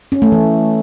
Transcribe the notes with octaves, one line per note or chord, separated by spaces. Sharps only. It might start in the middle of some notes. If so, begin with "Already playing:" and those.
C#4
A3
E3